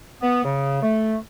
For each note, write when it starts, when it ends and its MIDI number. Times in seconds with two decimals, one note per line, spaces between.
0.21 0.41 59
0.44 0.82 49
0.82 1.15 57